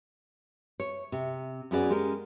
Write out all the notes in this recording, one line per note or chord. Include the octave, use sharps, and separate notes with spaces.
C#5
C3
F#2 B3 C#4 F#4 G#4 D5
G#3 C#4 G4 A#4